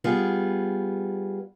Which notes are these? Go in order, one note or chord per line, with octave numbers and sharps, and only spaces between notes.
G3 B3 F4 G#4